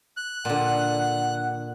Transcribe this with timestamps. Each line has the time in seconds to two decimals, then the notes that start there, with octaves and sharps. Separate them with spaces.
0.17 F#6
0.45 A#2 D3 F#5